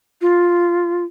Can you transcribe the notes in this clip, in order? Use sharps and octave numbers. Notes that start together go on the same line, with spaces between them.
F4